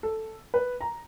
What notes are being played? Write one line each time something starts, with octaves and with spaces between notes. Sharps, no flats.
A4
B4
A#5